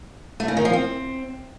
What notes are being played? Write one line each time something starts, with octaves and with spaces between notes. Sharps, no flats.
A3
C#3
D#3
F3
C4